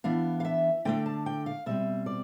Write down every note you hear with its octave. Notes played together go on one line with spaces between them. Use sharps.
E3 B3 D4 F5
F5
E5
D3 A3 D4 G5
A5
G5
F5
B2 G3 C4 E5
D5